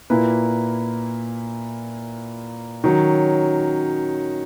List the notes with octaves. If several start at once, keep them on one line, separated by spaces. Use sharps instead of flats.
A#2 A#3 E4 B4
D#3 F#3 C#4